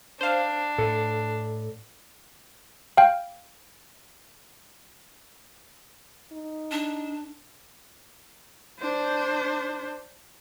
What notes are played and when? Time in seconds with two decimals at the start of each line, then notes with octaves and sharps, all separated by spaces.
0.21 D4 C5 F5
0.78 A2 A4
2.97 F5 G5
6.32 D#4
6.71 D4
8.79 D4 C5